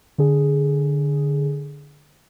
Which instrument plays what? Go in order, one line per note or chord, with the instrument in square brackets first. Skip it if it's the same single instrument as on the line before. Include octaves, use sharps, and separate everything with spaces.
[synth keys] D3 G#4